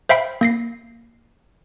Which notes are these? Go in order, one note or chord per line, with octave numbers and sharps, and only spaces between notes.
C5 E5 F5 G5 B5
A#3 A#6 C7